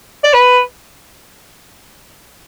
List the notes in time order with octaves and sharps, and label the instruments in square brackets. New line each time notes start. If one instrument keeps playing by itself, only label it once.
[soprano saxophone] D5
B4